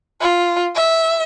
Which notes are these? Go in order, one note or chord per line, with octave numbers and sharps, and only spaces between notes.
F4
E5